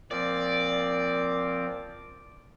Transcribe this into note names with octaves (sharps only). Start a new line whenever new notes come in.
A#2 F3 C4 D5